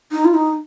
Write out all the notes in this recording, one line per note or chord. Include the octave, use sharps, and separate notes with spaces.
D#4
F4
D#4